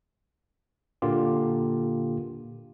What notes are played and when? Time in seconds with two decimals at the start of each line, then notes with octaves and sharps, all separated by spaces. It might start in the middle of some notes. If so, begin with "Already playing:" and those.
1.02 A#2 D3 A#3 F4 G4